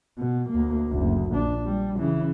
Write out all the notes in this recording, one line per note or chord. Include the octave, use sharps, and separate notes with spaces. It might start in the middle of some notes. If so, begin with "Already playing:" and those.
B2
D2 A#3
F#1 D2
A#1 D4
G3
C#3 E3